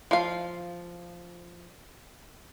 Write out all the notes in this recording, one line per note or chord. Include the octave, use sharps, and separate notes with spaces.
F3 F5